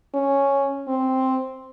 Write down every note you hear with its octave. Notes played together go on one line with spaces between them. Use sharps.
C#4
C4